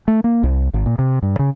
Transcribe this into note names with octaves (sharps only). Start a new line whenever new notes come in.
A3
A#3
C2
G#1
A#2
C3
G2
C#3